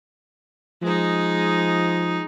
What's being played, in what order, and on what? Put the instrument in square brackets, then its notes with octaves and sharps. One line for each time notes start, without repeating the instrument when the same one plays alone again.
[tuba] F3 [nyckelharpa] G#3 D#4